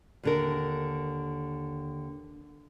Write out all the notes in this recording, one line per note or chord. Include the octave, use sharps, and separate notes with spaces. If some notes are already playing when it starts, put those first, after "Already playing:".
D#2 D3 A#4